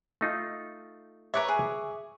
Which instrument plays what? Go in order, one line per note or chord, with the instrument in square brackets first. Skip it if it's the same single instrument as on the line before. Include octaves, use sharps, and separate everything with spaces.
[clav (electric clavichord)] A3 D#4 F4
[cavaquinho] A#4 B4 C#5 [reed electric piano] E5 C#6 D6
[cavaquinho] G#4